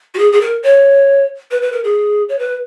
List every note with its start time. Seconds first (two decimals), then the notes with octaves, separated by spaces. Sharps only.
0.14 F#4
0.19 G#4
0.32 G#4
0.41 A#4
0.63 C#5
1.51 B4
1.62 B4
1.72 A#4
1.84 G#4
2.29 C#5
2.39 B4